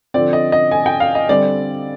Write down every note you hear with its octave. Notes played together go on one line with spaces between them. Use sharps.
D3 F3 C4 D5
D#5
D#5
G#5
G5
F5
D#5
D3 G3 C4 D5